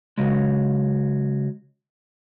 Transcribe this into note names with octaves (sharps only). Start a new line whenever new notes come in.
C#3 F#3 G#3